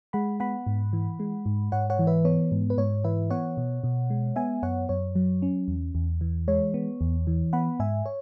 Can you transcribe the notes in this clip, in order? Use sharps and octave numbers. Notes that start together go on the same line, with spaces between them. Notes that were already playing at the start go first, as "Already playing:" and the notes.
G#3 F#5 B5
B3 F#5 B5
G#2
E3
G#3
G#2
G#2 C#5 F#5
C#5 F#5
E3
B4 E5
B3 C#5
G#2
B4
G#2 C#5
E3 B4 E5
B3 C#5 F#5
B2
B2
G#3
B3 E5 G#5
F#2 C#5 F#5
F#2 C#5
F#3
C#4
E2
E2
E3
G#3 C#5
B3
E2
E3
B3 F#5 B5
G#2 E5 G#5
C#5